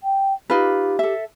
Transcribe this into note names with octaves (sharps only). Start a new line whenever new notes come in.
G5
D#4 F4 G4 B4
A4 E5